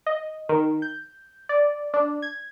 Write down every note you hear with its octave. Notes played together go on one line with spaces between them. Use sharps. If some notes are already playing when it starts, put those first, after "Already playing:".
D#5
D#3
G6
D5
D4
G#6